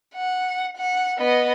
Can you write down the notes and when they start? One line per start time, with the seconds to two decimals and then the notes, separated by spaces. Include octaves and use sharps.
0.15 F#5
0.77 F#5
1.18 B3 D#5